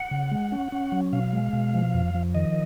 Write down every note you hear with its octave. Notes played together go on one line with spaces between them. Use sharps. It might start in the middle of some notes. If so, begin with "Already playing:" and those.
Already playing: F#5
C#3
G#3
C#4
C#4
F#3
B2 F5
G#3
B2
F3
F2
F3
D#3 D#5